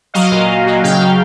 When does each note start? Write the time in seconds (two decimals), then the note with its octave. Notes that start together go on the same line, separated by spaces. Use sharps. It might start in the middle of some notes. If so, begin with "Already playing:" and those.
0.14 F#3 D#5 F5
0.31 A#2
0.49 A#2
0.66 F#3
0.83 C#3 F5 G5
1.00 C#3